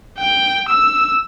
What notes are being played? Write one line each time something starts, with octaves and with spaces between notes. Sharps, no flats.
G5
E6